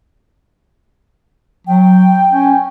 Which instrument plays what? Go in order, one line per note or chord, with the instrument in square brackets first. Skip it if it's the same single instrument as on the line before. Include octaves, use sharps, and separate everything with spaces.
[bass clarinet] F#3 [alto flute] G5
[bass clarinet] C#4